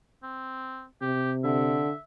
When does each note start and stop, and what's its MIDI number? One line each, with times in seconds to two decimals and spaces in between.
0.23 0.85 60
1.02 1.87 48
1.02 1.32 67
1.44 1.91 50
1.44 2.02 76